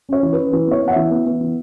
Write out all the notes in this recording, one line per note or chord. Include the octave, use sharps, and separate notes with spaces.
C#4 C#5
E3
C#4 B4
E3 B4
B3 C#5
B3
F#5
E3 E5
B3
B3
E3